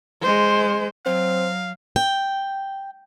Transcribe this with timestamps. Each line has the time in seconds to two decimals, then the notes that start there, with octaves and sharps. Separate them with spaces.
0.21 G#3 C5
1.06 F#3 C4 F5
1.96 G5